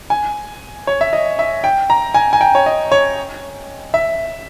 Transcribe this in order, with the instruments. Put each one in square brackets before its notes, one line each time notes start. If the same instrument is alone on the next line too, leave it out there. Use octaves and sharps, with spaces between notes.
[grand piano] G#5
C#5
E5
D#5
E5
G5
A#5
G#5
G#5
G5
C#5
D#5
C#5
E5